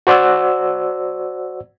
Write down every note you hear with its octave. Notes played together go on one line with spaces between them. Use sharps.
F#4 C5 D5 F#5 E6